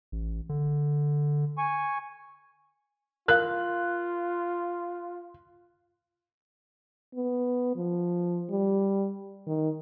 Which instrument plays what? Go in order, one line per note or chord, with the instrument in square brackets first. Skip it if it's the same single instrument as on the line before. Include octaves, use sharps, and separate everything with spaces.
[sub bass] A1
D3
[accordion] G#5 C#6
[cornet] F4 [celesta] A#4 F5 [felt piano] F#6
[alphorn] B3
F3
G3
D#3